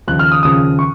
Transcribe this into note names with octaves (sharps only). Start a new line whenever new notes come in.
D#2 C#3 F3 F#6
F6
D#6
D#2 C#3 F3 D#6
C#6